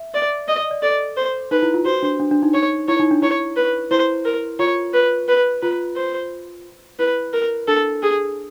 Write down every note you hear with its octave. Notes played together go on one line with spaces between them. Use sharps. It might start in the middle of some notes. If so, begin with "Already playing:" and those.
Already playing: E5
D5
D5 D#5
D#5
D5
A4 D5
C5
D#4 B4
E4
F4
F#4 C5
D4
D4
D4
D#4
D#4 C#5
E4 C#5
D#4
D4
E4 C#5
B4
E4 C5
A#4
F4 C#5
B4
B4
F4 B4
C5
E4 B4
A#4
D4 A4
G#4